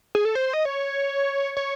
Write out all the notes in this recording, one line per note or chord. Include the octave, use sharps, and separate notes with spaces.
G#4
A4
C5
D#5
C#5
C#5